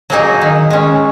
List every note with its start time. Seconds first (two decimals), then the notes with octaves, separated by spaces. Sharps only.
0.10 F#3 A#3 D#4 G#4
0.41 D#3
0.70 G#3 C#4